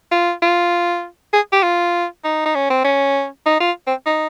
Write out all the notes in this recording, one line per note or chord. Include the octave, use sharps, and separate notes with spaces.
F4
F4
G#4
G4
F4
D#4
D#4
C#4
C4
C#4
D#4
F4
C4
D#4